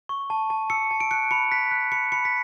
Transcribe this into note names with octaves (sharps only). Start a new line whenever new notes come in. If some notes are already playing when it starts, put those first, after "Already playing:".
C#6
A5
A5
E6 C#7
A5
D7
F#6 C#7
B5 C#7
F#6 B6
F#6
B5 C#7
B5 C#7
B6